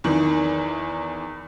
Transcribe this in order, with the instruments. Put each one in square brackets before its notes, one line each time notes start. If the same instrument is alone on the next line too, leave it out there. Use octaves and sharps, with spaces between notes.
[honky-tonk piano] E2 D#3 E3